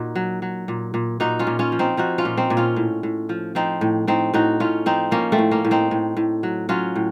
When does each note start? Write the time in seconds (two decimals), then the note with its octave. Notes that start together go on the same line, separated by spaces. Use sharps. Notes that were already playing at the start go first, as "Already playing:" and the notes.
Already playing: A#2 D#4 F#4
0.15 F#3
0.42 F#3
0.68 A#2
0.94 A#2
1.20 A#2 D#4 F#4
1.39 C#4 F4
1.47 A#2
1.59 C#4 F4
1.72 F3
1.79 C4 D#4
1.97 F3 D#4 F#4
2.18 C#4 F4
2.25 A#2
2.37 C4 D#4
2.50 A#2
2.57 C#4 F4
2.76 A2
3.03 A2
3.29 F3
3.55 F3 C4 D#4
3.81 A2
4.07 A2 C4 D#4
4.34 A2 D#4 F#4
4.60 A2 C#4 F4
4.86 F3 C4 D#4
5.11 F3 A#3 C#4
5.32 A3 C4
5.38 A2
5.51 A#3 C#4
5.65 A2
5.71 C4 D#4
5.91 A2
6.17 A2
6.43 F#3
6.69 F#3 C#4 F4
6.96 A2